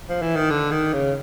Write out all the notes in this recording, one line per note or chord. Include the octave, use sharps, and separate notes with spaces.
F3
E3
D#3
D3
D#3
C#3